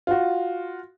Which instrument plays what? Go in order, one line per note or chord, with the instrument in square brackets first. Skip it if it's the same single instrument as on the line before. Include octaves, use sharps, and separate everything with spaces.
[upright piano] F4 F#4